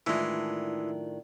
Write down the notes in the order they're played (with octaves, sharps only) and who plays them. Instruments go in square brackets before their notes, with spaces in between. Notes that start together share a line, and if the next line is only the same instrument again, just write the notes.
[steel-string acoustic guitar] A2 D#3 D4 [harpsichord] E3 G#3 [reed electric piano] E4 F4